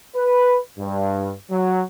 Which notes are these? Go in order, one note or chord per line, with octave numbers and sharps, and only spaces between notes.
B4
G2
F#3